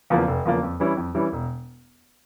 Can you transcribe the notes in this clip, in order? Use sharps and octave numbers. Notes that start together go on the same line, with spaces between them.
E2 C#3 F3 A#3
F1
E2 C#3 F3 A#3
F2
E3 G3 C#4 E4
F2
E3 G3 C#4 E4
E1